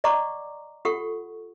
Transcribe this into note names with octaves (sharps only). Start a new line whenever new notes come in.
D5 D#5 F#5 A#5 C#6 D6
F4 G4 A4 F#5 C#6